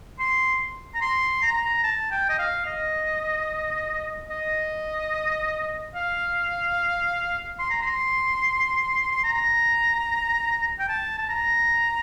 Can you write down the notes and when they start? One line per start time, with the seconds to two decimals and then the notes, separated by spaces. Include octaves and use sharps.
0.19 C6
0.95 A#5
1.02 C6
1.42 A#5
1.84 A5
2.12 G5
2.29 D#5
2.39 F5
2.66 D#5
4.30 D#5
5.95 F5
7.59 C6
7.71 A#5
7.82 C6
9.12 C6
9.24 A#5
10.80 G5
10.89 A5
11.18 A5
11.29 A#5